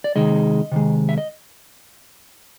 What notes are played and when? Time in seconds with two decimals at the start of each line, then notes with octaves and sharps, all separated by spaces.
0.04 D5
0.16 C3 D#3 G#3 D#5
0.72 C3 D#3 G#3
1.09 E5
1.18 D#5